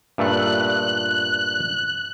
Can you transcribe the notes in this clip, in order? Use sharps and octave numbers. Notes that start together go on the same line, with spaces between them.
G2 A#2 A3 F#6